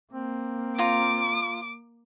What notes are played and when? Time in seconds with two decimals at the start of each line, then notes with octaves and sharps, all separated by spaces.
0.13 A#3 C4
0.78 F4 A#5 D6